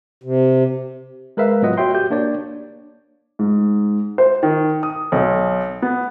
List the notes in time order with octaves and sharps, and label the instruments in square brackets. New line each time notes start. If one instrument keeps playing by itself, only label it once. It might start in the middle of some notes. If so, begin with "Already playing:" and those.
[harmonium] C3
[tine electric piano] G#3 A#4 B4 E5 F5
A2 F#3 B3 F4 D#5 F#5
F#4 C#5 E5 G5 C6
F#4 G4 G6
A#3 D4 C#5 D5
[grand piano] G#2
C5
D#3
D#6
B1
B3